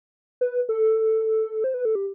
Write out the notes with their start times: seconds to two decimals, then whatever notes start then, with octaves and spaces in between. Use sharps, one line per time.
0.41 B4
0.69 A4
1.64 C5
1.74 B4
1.85 A4
1.95 G4